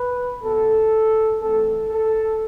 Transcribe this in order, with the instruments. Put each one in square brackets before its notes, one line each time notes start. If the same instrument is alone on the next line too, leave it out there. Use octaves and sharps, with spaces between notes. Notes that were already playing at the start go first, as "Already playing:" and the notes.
Already playing: [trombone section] B4
B2 B3 A4
E3 A3 C4 A4
A4